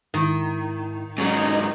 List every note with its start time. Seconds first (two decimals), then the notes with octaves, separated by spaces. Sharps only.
0.14 G#2 D#3 E4
1.18 G#2 F#3 C#4 D#4 C#6